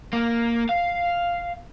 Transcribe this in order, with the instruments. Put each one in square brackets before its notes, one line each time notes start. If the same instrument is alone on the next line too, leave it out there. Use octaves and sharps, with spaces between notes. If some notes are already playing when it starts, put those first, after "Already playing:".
[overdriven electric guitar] A#3
F5